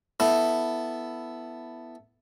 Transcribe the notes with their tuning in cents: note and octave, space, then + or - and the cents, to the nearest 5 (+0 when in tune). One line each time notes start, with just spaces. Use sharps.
B3 +0 E4 +0 A4 +0